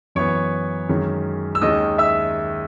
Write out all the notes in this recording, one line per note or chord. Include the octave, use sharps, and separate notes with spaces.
F#2 E3 B3 C#5 C#6
F#2 D#3 G#3 C#4
E6
D#2 D#3 G#3 C#4 D#5 D#6
E5 E6